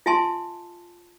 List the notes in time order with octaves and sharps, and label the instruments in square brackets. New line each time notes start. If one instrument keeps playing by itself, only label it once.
[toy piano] F4 E5 G#5 A5 C6